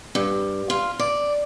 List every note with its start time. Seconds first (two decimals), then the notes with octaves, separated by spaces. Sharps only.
0.15 G2
0.70 F4
0.99 D5